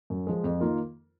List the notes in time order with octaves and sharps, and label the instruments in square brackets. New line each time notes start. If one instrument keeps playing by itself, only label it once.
[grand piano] F#2
F3 G#3
F2
D#3 A#3 F4 A#4